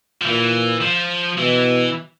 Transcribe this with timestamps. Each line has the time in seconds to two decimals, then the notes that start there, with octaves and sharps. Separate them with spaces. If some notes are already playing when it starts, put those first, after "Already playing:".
0.21 F3
0.25 A#2 E3
0.81 F3
1.37 B2 E3